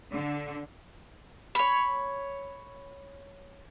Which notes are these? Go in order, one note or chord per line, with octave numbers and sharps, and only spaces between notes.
D3
C#5 B5